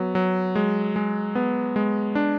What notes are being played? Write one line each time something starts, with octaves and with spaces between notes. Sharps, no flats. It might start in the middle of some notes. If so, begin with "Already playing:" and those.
Already playing: F#3 B3
F#3
G#3
G#3
B3
G#3
D4